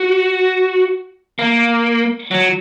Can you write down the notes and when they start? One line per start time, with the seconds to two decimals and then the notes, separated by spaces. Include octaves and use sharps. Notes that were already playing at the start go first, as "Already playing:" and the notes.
Already playing: F#4
1.39 A#3
2.31 F#3